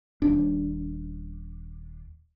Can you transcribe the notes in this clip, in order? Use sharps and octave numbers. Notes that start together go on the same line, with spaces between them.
D#1 D4